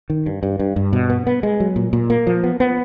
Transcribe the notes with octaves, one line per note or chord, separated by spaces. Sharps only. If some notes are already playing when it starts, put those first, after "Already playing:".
D#3
G2
G2
G2
G2
B2
B3
B3
G#3
F#3
A#2
A#2
A#3
F3
B3
B3